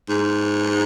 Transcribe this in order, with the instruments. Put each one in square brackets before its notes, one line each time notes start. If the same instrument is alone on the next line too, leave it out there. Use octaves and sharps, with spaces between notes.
[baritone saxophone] G#2